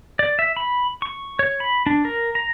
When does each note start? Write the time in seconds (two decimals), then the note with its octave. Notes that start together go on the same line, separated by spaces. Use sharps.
0.19 D5
0.39 E5
0.57 B5
1.02 C#6
1.39 C#5
1.60 B5
1.86 D4
2.05 A#4
2.35 A#5